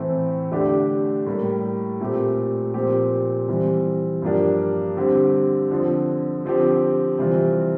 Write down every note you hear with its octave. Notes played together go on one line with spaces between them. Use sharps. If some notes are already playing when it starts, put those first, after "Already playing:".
Already playing: A2 E3 A3 C4
D3 A3 D4 G4
A2 G3 A#3
A#2 A3 C4 G4
A#2 F3 C4 G4
E3 G3 C4
G2 F3 A#3 D4 G4
D3 G3 C4 G4
D3 F3 C4
D3 F3 C4 G4
C3 E3 G3 C4 F4